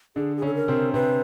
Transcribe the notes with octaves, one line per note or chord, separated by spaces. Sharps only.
D3 D4 G#4
G#4
C#3 C#4 A4
A#4
C3 C4
C3 C4 B4